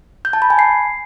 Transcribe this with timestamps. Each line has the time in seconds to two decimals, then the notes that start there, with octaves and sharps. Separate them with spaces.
0.25 G6
0.33 A5
0.42 B5
0.50 G#5
0.59 C7